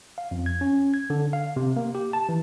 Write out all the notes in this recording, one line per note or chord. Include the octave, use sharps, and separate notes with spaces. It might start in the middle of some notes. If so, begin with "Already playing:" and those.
F5
F2
G#6
C#4
G#6
D3
F5
C3
A#3
G4
A5
E3